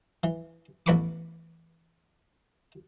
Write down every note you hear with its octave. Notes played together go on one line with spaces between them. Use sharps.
E3
A1 E2 B4 B5 C#6 D6